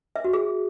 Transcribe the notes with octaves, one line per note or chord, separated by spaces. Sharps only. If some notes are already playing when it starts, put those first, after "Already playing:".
E5
F#4
G#4